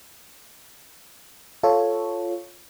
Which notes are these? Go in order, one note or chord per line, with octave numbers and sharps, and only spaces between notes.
F4 A4 C#5